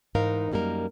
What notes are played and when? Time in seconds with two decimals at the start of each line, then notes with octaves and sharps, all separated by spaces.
0.15 G#2 E3 D#4 A#4 F5
0.52 F#2 G3 A#3 D#4 A#4